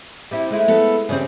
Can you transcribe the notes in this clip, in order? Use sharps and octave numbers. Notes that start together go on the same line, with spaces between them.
G3 C4 E4
G#3 A3 E4
B3 A4 B4
E2 G2 C#3 G3 C4